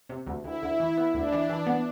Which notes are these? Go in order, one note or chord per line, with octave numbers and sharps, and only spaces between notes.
C3
D2
D2 E4
D2
E3
B3
D2 D4
E3
E3
B3